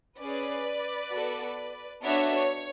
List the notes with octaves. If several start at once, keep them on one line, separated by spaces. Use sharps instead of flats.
C#4 G#4 B4 D5
B3 F#4 A4
B3 D4 F#4 A4 C#5 E5
C#5